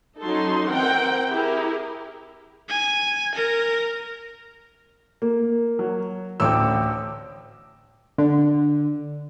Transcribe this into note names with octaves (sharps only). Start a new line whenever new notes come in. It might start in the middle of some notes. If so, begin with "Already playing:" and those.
F#3 C#4 D#4 A4 C6
E3 C4 A#4 F#5 G5
E4 G4 G#4 A#4
G#5
A#4
A#3
F#3
A1 D2 G5 D6 E6
D3